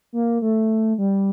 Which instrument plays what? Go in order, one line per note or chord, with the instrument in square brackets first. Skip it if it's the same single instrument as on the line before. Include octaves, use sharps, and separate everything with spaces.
[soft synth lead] A#3
A3
G3